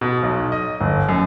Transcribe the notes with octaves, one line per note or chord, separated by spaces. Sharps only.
B2
B1
D#5
G1
F#2